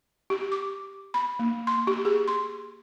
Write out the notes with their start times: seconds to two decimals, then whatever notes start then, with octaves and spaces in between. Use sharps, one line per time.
0.30 G4
0.52 D6
1.14 B5
1.39 A#3
1.67 C6
1.87 G4
2.05 G#4
2.28 C6